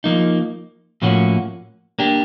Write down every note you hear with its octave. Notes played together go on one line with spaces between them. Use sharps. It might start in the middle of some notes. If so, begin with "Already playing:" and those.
F3 A#3 D#4
A2 F3 A#3 C#4 F#4
A#3 D4 G4